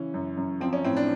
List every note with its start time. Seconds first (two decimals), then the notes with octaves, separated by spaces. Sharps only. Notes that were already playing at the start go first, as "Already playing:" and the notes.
Already playing: C#3 E3 C#4
0.14 F#2
0.37 F#2
0.60 F3 C4
0.73 C#4
0.84 A2 C4
0.97 D4